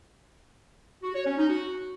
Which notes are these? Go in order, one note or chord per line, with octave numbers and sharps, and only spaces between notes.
F#4
C#5
C#4
D#4
F#4